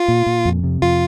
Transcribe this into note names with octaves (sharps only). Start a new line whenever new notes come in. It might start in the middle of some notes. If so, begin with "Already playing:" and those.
Already playing: F4
A#2
A#2
F2
C3
F2 F4